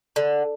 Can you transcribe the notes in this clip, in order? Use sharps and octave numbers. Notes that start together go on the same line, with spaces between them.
D3